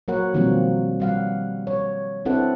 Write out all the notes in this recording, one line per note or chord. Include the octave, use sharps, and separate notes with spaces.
F#3 A#3 F#4 A#4 C#5 F#5
B2 D#3 F3 G3 A#3 C4
G3 F5 F#5
C#5
C4 D4 E4 A4 B4 F#5